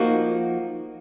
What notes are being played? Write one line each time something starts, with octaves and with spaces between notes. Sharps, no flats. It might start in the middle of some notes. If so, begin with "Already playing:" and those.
Already playing: F3 A#3 D#4 F#4